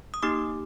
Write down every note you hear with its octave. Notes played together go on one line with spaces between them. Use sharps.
D#6
A#3 D#4 G4 D6